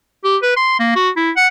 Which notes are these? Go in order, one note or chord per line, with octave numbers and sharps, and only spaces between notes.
G4
B4
C6
A#3
F#4
E4
F#5